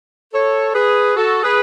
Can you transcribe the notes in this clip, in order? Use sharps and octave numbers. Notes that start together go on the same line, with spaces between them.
A4 C#5
G#4 B4
F#4 A4
G#4 B4